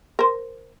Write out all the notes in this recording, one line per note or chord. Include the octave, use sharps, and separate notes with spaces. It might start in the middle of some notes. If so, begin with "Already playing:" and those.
A#4 C5